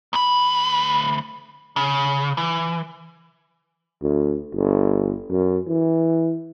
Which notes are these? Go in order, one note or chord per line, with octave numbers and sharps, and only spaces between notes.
D2 B5
C#3
E3
D2
G1
F#2
E3